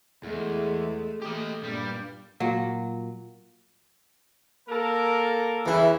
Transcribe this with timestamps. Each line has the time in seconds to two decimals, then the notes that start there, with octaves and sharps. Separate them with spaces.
0.24 E2 G#3 A3
1.22 A3 G4 D#5
1.63 G2 A#2 G3 D4
2.40 A#2 F#3
4.69 A#3 A4 A#4
5.66 E2 C#3 E3 E4